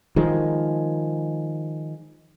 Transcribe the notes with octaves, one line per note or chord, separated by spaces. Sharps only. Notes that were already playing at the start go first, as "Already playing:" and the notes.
D#3 F3 G#3